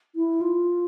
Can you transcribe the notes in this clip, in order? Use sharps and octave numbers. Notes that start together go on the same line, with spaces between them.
E4
F4